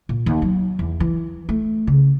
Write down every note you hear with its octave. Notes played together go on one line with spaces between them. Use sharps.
A#2
D#2
F#3
E2
E3
A3
C#3